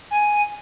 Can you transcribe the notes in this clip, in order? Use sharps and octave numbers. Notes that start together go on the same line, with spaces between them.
G#5